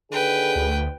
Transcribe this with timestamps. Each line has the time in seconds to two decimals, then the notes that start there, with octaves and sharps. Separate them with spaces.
0.12 D#2 D3 G#4 B4 G5
0.55 D2